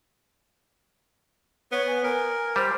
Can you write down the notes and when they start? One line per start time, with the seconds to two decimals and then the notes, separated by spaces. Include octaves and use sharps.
1.72 B3 C#5
1.87 G#5
2.04 A#4 G#5
2.56 G3 C5